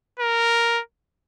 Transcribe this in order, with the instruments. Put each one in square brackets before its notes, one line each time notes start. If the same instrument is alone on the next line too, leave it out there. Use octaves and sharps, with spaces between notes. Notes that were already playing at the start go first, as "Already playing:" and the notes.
[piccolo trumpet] A#4